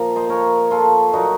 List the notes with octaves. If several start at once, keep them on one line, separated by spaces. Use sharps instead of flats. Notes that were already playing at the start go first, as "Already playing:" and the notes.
Already playing: A#2 F3 A#4 F5
C5 D#5
A#4 C#5
F4 A4
A#2 F#3 D#4 F#4